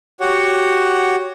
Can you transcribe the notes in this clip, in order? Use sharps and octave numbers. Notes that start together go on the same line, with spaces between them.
F#4 G4 C#5 F#5